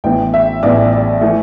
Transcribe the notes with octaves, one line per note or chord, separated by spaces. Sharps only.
A1 A2 E3 B3 G5
E5
A1 A2 E3 B3 D5
D5
E3 A3